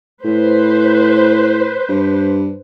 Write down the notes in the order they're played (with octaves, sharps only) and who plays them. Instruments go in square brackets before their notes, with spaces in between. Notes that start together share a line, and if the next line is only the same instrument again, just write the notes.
[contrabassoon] A2 [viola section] B4 C5
[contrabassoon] G2